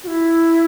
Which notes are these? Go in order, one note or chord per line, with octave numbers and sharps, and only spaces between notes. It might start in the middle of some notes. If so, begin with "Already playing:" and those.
F#4
E4